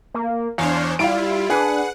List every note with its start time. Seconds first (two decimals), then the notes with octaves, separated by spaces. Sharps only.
0.14 A#3
0.58 E2 D4 C5 C#5 F5
0.99 G3 E4 F4 F5 D7
1.50 D4 G#4 B4 F#5